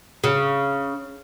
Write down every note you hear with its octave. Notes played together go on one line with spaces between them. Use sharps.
C#3